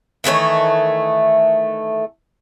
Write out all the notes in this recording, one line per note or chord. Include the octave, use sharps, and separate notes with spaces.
D#3 E3 A3 C#5